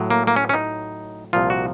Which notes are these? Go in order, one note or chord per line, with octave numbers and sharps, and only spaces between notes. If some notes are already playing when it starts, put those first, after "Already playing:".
Already playing: A2 F#3
A#3
A#3
C#4
C#4
D#4
C2 A#2 F3 F4
F#4